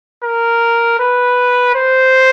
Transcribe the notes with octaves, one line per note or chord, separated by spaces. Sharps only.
A#4
B4
C5